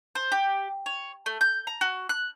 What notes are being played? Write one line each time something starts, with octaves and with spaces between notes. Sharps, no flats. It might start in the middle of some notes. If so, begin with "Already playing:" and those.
C5
G4
C#5
A3
G6
A#5
F#4
F#6